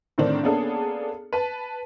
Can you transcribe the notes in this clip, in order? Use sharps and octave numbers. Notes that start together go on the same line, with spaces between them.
A2 D3 D#3 C4 D4
A#3 B3 C#4 D4 G#4 A4
B4 A5